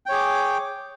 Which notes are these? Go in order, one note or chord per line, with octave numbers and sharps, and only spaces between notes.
G#4 C#5 G5 D6